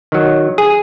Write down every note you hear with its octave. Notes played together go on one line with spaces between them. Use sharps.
D#3 F#3
G#4